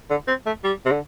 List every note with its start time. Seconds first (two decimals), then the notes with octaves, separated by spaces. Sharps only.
0.10 D3
0.28 C4
0.46 A3
0.64 G3
0.86 C3
0.91 D3